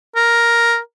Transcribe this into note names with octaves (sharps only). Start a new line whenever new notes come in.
A#4